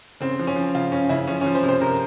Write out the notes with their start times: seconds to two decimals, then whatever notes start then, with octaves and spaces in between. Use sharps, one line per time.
0.21 C#3 C4
0.39 F3
0.47 C#4
0.56 F3
0.75 C#3 F4
0.92 C#3 C#4
1.09 C#3 E4
1.28 F3 C#4
1.41 C#4
1.46 F3
1.55 C5
1.63 C3
1.69 C5
1.81 C3 A#4